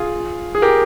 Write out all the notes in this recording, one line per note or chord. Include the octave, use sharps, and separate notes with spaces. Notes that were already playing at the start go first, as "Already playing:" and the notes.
Already playing: F4 G#4
G#4
G4 A#4